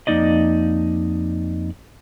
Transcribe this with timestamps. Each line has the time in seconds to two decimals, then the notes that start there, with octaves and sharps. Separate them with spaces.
0.07 F2 A#3 D#4 D5 D#5